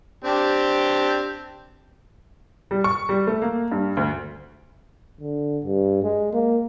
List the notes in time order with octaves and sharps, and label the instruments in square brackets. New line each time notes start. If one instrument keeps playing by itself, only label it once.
[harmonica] C4 D4 G4
[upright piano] G3
C#6
G3
A3
A#3
G2
D2
[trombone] D3
G2
G#3
A#3